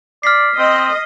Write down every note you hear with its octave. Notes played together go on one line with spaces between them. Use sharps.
D5 F6 B6 C7
C4 D#5